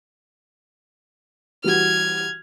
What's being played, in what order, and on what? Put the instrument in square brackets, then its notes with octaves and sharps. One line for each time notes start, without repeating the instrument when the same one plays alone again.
[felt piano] E3 G3 F#4 [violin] F6 G#6